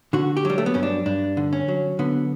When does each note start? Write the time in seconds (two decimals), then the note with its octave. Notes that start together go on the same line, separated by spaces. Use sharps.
0.13 D3 F#4
0.37 G4
0.45 F#3 G3
0.58 A3
0.66 B3
0.74 G2 C#4
0.83 D4
1.06 G2 D4
1.37 D3
1.53 C#4
1.68 F#3
1.99 D3 B3